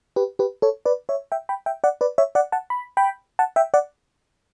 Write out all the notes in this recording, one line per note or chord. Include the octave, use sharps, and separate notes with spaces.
G4 B4
G4 B4
A4 C#5
B4 D5
C#5 E5
E5 G5
G5 B5
E5 G5
D5 F#5
B4 D5
C#5 E5
D5 F#5
F#5 A5
B5
G5 B5
F#5 A5
E5 G5
D5 F#5